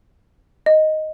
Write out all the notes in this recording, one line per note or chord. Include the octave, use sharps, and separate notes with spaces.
D#5